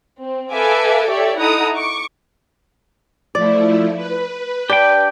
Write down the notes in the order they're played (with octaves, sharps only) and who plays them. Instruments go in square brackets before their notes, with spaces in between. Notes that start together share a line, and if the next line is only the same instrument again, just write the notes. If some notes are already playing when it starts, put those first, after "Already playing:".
[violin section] C4
A4 B4 E5 F5 G#5 D6
G4 A4 C#5 D5 E5
D#4 E4 A4 F#5 A#5 D#6
C#6 D6
[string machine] F3 A3 E4 [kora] D5
[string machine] B4
[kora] D4 [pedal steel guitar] G4 G5